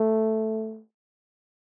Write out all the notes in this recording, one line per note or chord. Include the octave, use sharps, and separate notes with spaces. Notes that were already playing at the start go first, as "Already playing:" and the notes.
Already playing: A3